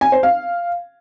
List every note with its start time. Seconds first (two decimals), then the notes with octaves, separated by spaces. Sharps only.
0.01 G#5
0.12 C5
0.23 F5